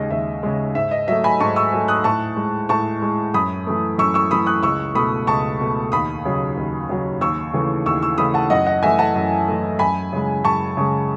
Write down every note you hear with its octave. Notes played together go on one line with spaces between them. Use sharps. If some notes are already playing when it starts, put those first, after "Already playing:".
Already playing: D#2 C#3 G#3 D#5
D#2 E5
C#3 G#3
G#2 E5
D#5
F#3 A3 E5
G#5 B5
G#2 A5 C#6
C#6 E6
F#3 A3
D#6 F#6
A2 A5 C#6
G#3
A2 A5 C#6
G#3
F#2 B5 D#6
E3 A3
F#2 C#6 E6
C#6 E6
E3 A3 B5 D#6
D#6 F#6
C#2 C#6 E6
B2 A3 B5 D#6
C#2 A5 C#6
B2 A3
D#2 B5 D#6
C#3 F#3
D#2
C#3 F#3
D#2 C#6 E6
C#3 E3 A3
D#2 C#6 E6
C#6 E6
C#3 E3 A3 B5 D#6
F#5 A5
F#2 D#5 F#5
D#5 F#5
E3 A3 E5 G#5
F#5 A5
F#2
E3 A3
F#2 G#5 B5
C#3 G#3
F#2 A5 C#6
C#3 G#3